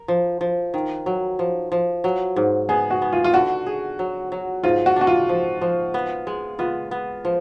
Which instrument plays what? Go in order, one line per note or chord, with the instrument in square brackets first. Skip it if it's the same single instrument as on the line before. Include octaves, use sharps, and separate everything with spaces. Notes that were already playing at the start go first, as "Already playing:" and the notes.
Already playing: [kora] A#4
F3
F3
D#3
F#3
F3
F3
F#3
G#2
[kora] B3 [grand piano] G#4
[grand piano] F#4
[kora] B3
[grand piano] F4
F4
[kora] D3 [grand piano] F#4
[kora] G#4
F#3
F#3
[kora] G#2 [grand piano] F4
[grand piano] F#4
[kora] D4 [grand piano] F#4
[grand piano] F4
[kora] F3
F3
B3
G#3
[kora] B3 [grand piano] F4
[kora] B3
F3